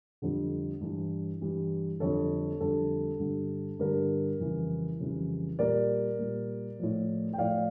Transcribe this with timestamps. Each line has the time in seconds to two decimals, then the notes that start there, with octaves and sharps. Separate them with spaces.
0.22 F2 D3 G3
0.81 G2 E3 G3
1.41 G2 E3 G3
2.00 F2 D3 G3 A4 C#5
2.60 F2 D3 G3 A4
3.20 G2 D3 G3
3.79 G2 D3 G3 A#4
4.40 F2 C#3 E3 G3
5.00 F2 C#3 E3 G3
5.59 A#2 G3 A#4 D5
6.19 A#2 G3
6.79 A2 F3
7.33 G5
7.38 A2 F3 D5 F5